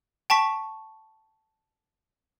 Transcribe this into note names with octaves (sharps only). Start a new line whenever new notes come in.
G5 A5 C#6 B6